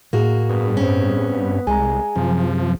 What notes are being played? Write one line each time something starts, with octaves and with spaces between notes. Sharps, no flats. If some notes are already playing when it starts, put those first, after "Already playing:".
A2 A#3 F#4 G#4
G2 B3
C4 C#4
C2 G#3 G#5 A#5
F#2 C3 F3